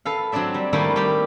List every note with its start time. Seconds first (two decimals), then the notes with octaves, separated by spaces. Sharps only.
0.05 A4 B4 F5
0.32 F#3 C4 D4 D5 E5
0.54 G3
0.73 D#3 G3 A3 A#3 D#4 E4
0.96 G3 G4